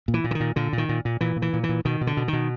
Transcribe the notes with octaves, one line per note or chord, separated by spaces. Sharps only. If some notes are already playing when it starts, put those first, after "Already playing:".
A#2
E3
A#2
D3
D#3
A#2
A#2 D3
A#2
D#3
A#2
A#2
A#2 E3
A#2
E3
A#2
E3
A#2
B2 D#3
B2
D3
B2
D#3
B2